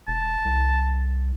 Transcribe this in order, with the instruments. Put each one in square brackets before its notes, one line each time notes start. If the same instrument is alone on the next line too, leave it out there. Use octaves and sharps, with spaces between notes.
[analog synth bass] E1 [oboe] A5
[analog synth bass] C2